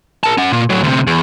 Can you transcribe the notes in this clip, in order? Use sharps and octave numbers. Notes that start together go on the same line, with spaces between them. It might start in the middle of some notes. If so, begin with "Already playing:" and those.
A#4 A5
C#4 F#5
A#2
A2 F#3
D2 C3
E2